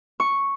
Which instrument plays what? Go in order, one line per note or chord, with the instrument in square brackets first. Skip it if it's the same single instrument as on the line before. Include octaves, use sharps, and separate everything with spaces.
[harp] C#6